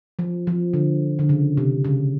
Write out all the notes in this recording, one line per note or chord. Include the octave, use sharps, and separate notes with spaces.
F3
F3
D3
D3
C#3
C3
C#3